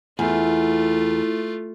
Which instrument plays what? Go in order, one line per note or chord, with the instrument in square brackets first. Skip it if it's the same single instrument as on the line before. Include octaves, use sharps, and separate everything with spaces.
[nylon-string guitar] E2 [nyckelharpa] A3 F4